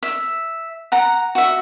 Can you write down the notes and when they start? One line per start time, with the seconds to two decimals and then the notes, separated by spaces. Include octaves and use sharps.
0.03 E5
0.92 F#5 A#5
1.35 F#4 E5